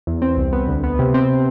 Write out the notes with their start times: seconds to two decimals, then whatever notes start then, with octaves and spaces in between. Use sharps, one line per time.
0.07 E2
0.22 C4
0.37 C2
0.53 B3
0.67 D2
0.84 B3
0.99 C3
1.14 C4